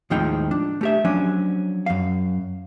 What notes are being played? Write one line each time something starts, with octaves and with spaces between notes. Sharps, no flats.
D#2 A2 F3 G#3 D#4 G5
D4
A3 G4 E5
F3 F#3 C#4 D4
F#2 F5